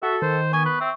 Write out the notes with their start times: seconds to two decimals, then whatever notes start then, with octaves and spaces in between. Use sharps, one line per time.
0.03 F#4 A4 E5
0.22 D#3 C5
0.53 B3 G#5 C#6
0.65 B4
0.80 C4 E5